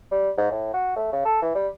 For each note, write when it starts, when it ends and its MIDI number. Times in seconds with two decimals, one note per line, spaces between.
0.11 0.30 55
0.37 0.49 44
0.51 0.72 45
0.74 0.95 66
0.96 1.12 57
1.13 1.22 49
1.25 1.41 69
1.42 1.53 52
1.55 1.68 55